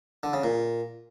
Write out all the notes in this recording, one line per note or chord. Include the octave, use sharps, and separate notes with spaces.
D3
C#3
A#2